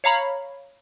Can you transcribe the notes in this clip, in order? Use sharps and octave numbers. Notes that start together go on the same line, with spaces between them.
C#5 F5 A#5 B5